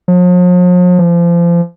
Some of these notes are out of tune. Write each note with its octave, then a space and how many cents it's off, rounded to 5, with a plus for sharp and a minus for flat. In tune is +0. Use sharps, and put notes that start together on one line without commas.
F3 +45
F3 -30